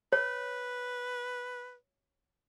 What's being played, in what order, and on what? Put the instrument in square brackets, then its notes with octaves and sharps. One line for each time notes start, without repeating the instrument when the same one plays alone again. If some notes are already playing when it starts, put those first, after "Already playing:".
[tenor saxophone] B4 [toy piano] C#5